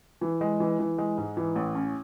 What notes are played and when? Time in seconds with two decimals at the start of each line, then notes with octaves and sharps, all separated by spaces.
0.21 E3
0.41 G#3
0.60 E3
0.79 E3
0.98 G#3
1.18 G#2
1.37 E3
1.56 A1
1.75 C#4